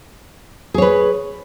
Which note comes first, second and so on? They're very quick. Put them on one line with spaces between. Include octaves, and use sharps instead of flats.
G#4 C#5 B4